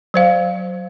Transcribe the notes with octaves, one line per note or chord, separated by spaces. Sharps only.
F#3 C5 F5